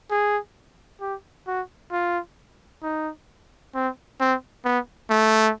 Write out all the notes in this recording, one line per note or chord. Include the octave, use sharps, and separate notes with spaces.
G#4
G4
F#4
F4
D#4
C4
C4
B3
A3